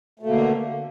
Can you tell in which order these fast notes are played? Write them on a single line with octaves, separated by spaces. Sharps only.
A3 B2 A#3 D3